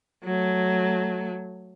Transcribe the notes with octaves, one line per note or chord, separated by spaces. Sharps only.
F#3 A3